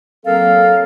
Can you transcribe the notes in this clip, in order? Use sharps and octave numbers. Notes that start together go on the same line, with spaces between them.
F#3 A#3 C4 A4 A#4 F5